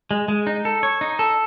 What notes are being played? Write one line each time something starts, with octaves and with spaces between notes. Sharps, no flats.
G#3
G#3
D#4
A4
C#5
D#4
A4